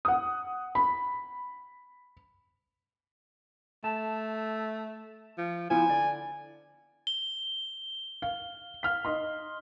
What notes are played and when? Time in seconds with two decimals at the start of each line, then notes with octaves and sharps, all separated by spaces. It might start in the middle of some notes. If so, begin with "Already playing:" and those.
0.05 F#5 D#6
0.75 B5
3.84 A3 A5
5.38 F3
5.70 F3 B3 E4 C5 G#5
5.90 D3 D5
7.07 G7
8.22 F5
8.83 F5 F6 B6
9.05 D#4 D#5 C6